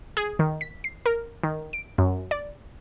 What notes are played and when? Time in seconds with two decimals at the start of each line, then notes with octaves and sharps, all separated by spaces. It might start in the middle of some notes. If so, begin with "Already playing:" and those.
0.17 G#4
0.39 D#3
0.61 B6
0.84 C7
1.06 A#4
1.43 D#3
1.73 D7
1.98 F#2
2.31 D5